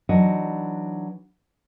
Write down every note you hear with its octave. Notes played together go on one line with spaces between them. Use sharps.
E3 F#3 D4 D#4 D#5